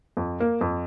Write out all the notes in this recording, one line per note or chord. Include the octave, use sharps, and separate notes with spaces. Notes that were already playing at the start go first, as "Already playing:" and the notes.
F2
A#3
F2